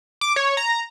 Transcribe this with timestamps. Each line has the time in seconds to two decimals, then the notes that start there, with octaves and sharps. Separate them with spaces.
0.21 D6
0.36 C#5
0.57 A#5